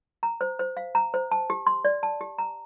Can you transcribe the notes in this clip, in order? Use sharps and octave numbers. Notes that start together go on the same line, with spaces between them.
A#5
C5
C5
F5
A#5
C5
A5
G4
C6
D5
A5
G4
A#5